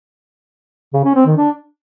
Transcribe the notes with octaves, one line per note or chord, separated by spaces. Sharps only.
C#3
C#4
C4
D#3
D4